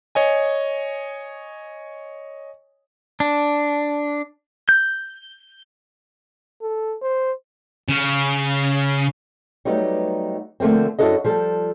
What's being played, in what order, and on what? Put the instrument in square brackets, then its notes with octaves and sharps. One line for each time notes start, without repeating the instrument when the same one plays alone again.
[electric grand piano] C#5 D#5 G#5
[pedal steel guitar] D4
G6
[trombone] A4
C5
[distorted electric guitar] C#3
[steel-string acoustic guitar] F#3 G3 A3 B3 D#4 G4
D3 F3 A3 A#3 C4
F#2 D4 E4 F#4 A4 D#5
F3 G3 A4